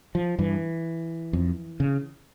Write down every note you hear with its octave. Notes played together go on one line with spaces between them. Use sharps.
F3
G2 E3
F2
C#3